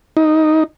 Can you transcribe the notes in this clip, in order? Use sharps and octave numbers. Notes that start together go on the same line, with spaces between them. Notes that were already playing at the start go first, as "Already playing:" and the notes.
D#4